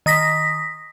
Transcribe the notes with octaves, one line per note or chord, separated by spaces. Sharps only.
D#3 D#6 A#6 B6